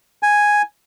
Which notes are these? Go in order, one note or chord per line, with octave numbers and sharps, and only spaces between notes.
G#5